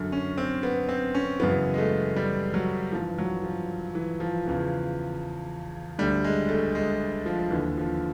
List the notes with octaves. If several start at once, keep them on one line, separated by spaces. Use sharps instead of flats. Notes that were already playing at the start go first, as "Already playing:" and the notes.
Already playing: F#2 D3
C#4
C4
B3
C4
C#4
F#2 C#3 E3 B3
G#3
A3
G3
F#3
G2 E3 F3
F#3
F3
E3
F3
E2 C#3 E3
D2 D3 G3
G#3
A3
G#3
F3
D#2 D3 E3
F3